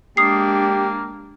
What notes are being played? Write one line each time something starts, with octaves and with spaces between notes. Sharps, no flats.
G#3 A#3 D4 G4 D#6 C7